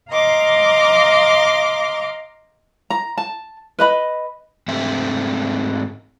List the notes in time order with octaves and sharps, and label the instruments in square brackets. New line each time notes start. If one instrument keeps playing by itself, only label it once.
[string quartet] D#5 F5 A#5 C6 D6
[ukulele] A#5
A5
B4 D#5 B5
[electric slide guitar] G#2 A3 C4 E5